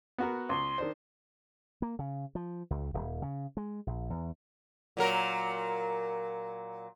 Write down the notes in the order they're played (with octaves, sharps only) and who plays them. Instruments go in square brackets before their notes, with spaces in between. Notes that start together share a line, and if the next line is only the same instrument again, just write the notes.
[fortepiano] B3 F#4 A#4
[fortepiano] C#2 [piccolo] C6
[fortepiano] D#3 D4 C5
[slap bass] A#3
C#3
F3
C#2
D#1
C#3
G#3
A#1
E2
[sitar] A#2 F#3 A#4